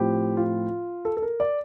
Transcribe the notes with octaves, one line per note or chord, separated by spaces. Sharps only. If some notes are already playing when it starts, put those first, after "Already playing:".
Already playing: A2 F3 C4 G4
F4
A4
A4
A#4
D5